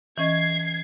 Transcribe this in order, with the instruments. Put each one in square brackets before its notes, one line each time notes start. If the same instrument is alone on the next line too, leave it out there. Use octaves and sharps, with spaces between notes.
[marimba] E3 C#4 D#5 [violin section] G#6 C7